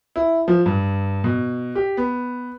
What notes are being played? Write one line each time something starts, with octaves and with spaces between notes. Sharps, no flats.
E4
F3
G2
B2
G4
B3